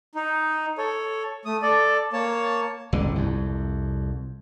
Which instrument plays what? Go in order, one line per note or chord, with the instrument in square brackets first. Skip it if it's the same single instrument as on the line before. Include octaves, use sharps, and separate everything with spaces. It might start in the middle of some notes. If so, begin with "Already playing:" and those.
[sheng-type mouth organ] D#4
A4 C#5
A3 D#6
A4 D5
A#3 C#5 A5
[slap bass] G1 C#2 D3
C2 F2